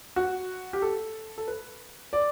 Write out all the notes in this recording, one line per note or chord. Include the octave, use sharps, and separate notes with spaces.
F#4
G4
A4
A4
B4
D5